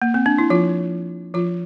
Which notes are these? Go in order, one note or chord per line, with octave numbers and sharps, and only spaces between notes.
A#3
C4
D4
E4
F3 F4
F3 F4